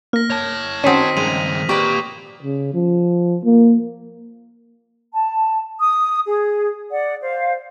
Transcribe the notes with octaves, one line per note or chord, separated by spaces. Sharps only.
A#3 F6 A#6
C#5 A5
D#3 C4 C#4 F#4 D#6 B6 D#7
G2 D#3 G#3 D#7 F7
A#3 G4 B4 D5 C#6
C#3
F3
A#3
A5
D#6
G#4
D5 F#5
C5 F5